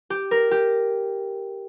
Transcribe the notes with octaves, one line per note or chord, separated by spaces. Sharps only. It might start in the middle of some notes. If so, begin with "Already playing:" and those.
G4
A#4
G4